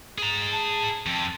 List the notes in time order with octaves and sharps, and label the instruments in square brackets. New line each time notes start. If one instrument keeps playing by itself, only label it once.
[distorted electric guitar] G#4 A#5
[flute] A5
[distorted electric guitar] F2